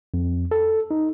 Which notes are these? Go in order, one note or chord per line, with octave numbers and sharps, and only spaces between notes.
F2
A4
D#4